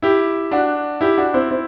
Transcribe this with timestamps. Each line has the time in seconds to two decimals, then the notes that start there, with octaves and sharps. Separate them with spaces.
0.02 E4 G4
0.51 D4 F#4
1.01 E4 G4
1.18 D4 F#4
1.34 C4 E4
1.51 C4 E4